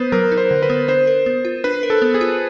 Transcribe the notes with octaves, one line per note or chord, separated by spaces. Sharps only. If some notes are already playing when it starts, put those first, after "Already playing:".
Already playing: B3 B4 C5
F#3 A#4
D#4
C5
D3
B4
B3
D4 C5
A#4
B3
F4
D4 B4
A#4
A4
B3
G#4
F4